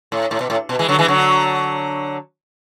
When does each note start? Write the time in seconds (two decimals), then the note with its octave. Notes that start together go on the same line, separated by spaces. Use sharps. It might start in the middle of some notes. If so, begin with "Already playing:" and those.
0.12 A2
0.31 A2
0.41 B2
0.50 A2
0.69 B2
0.79 E3 G#3
0.88 D3 F#3
0.99 E3 G#3
1.08 D3 F#3